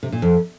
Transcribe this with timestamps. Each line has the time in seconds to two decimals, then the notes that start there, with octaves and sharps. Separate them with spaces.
0.03 C3
0.12 A#2
0.22 F2